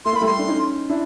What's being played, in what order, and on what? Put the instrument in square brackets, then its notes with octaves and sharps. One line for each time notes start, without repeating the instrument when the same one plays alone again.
[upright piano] A3 [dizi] C6
[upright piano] A#3
[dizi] B5
[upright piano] G3 A3 [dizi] C6
[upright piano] D4
C#4 D#4
D4 E4